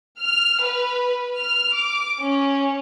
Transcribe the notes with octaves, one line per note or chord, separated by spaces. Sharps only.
F6
B4
F6
D6
C#4